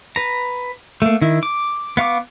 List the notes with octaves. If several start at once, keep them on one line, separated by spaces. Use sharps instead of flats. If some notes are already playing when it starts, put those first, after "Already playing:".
B4 A#5
A3 A#3
D#3 E4
D6
B3 F5 C#6 D6